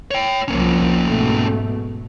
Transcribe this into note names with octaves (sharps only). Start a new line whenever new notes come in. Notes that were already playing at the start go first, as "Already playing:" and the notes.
C#5 G5
C2 F3 A#3 C#4
G#2 B2 A3